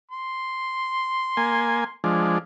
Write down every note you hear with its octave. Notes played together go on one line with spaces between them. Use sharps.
C6
A#3 G#5
F3 G#3 D4